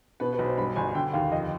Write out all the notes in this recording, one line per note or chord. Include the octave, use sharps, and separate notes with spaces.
B2 B4
B4
B1
C5
G2 B5
G1 G#5
D3 G5
D#2 F5
F2 D#5